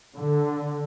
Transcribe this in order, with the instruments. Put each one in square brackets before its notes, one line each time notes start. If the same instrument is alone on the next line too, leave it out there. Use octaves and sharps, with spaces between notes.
[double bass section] D3